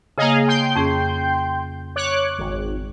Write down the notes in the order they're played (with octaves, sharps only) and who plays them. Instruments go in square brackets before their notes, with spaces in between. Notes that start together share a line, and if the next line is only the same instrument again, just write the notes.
[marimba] C#3 A#3 [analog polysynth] G#4 D#5 F5
[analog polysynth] G5 C6 G6
[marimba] F2 C#4 G#4
[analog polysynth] C#5 D6 F#6
G#1